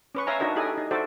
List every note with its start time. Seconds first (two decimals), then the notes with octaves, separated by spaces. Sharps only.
0.15 C#4 B4 C#6
0.27 C#5 E5 F5 G#5 A#5
0.39 D4 D#4 F#4 A#4 D#5 E5
0.56 E4 G4 A4 D#5 G#5
0.78 D#4
0.91 F#4 A4 C5 D5 E5